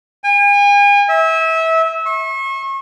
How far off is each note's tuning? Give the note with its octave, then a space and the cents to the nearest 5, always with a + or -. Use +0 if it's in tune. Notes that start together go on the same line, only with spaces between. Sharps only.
G#5 -40
E5 -25
C#6 -35